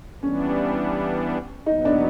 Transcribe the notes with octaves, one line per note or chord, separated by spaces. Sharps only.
E3 G3 B3 C#4 D4
E2 B2 F#3 B3 D#4
D4